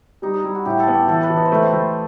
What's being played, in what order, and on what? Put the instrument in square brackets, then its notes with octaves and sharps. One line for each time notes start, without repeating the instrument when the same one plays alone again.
[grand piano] G3 [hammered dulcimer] D#4
[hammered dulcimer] D#4
[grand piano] G3 [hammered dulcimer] E4
[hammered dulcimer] F#4
[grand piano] A2 [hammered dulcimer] G4
[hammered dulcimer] A4
[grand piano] B3
[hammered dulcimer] G4
[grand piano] E3 [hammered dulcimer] A4
[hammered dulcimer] B4
[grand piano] E3
[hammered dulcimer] D#5
C5
[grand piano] A3 [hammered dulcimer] B4
[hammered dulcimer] C5
[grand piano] A3